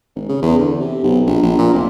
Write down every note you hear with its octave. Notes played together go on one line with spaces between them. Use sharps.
G#1
C#3
E2
D3
C3
B1
A#1
A#1
A#2
F1